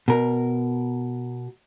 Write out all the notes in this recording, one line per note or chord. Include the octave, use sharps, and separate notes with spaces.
B2 A#4